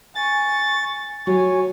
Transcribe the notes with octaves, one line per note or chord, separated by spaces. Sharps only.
G#5 C#6 A6
F#3 C#5 G#5